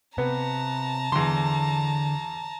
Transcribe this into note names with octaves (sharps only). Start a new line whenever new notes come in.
C3 B3 A5 A#5
E2 D3 C6